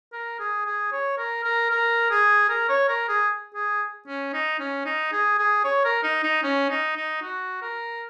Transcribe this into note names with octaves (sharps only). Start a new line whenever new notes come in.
A#4
G#4
G#4
C#5
A#4
A#4
A#4
G#4
A#4
C#5
A#4
G#4
G#4
C#4
D#4
C#4
D#4
G#4
G#4
C#5
A#4
D#4
D#4
C#4
D#4
D#4
F#4
A#4